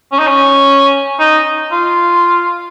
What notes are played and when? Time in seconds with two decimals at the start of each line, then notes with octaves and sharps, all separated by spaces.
0.12 C#4
0.19 D#4
0.27 C#4
1.19 D#4
1.72 F4